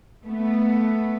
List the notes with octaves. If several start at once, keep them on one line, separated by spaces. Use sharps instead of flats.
A3 B3